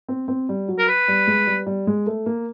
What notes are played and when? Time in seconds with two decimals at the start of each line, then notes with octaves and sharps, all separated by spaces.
0.08 C4
0.28 C4
0.49 G3
0.68 F#3
0.78 A#4
0.88 B4
1.08 G3
1.28 G#3
1.47 G3
1.66 G3
1.87 G#3
2.07 A3
2.26 A#3